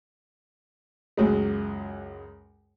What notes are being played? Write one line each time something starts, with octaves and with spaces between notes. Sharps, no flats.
C#2 F#2 F#3 G#3